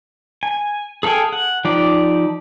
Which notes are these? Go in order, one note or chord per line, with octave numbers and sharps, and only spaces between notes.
G#5
G#4 A4 F5 G5 G#5
F#5
F3 D#4 G4 D5